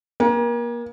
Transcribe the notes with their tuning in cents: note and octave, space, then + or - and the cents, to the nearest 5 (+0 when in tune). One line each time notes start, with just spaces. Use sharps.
A#3 +30 G5 +45